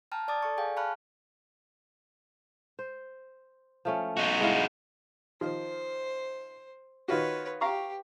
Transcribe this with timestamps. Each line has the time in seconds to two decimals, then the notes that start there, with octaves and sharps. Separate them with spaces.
0.12 G5 A5 A#5 F6
0.28 D5 A5 D6 D#6 A6
0.42 A4 D5 C#6
0.57 G#4 F5 G5 G#5
0.76 F5 A5 B5 C#6 F6 F#6
2.79 C5
3.85 F3 A3 C#4
4.17 D#4 F#4
4.40 G#3 E4 F5
5.41 D#3 F3 C5
7.08 D#3 F4 F#4 B4 C#5
7.61 G4 F5 A#5 C#6